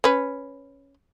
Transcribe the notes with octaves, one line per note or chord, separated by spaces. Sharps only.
C#4 B4